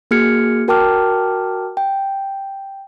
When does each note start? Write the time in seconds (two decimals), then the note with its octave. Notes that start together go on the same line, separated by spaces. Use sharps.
0.11 A#3 F#4 G#4 F6 G#6 C#7
0.68 F#4 A#4 G5 A5 D6 F6
1.77 G5